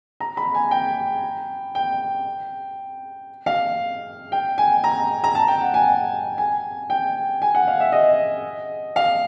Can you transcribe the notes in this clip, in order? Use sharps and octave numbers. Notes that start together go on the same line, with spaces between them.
A#5
B5
G#5
G5
G5
F5
G5
G#5
A#5
A#5
A5
G5
F#5
G#5
G#5
G5
G#5
F#5
F5
E5
D#5
F5